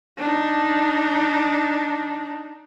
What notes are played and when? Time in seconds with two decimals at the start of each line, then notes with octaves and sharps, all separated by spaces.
0.18 D4 D#4